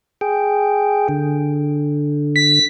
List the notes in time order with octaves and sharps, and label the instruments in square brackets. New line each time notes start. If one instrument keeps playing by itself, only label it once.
[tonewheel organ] G#4 G5
D3
[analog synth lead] B6